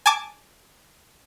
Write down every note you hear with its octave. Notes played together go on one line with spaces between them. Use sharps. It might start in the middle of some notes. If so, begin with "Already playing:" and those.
G#5 A5 D6